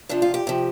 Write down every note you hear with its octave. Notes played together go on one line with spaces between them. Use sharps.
C3 F3 D4
F4
G4
C3 F3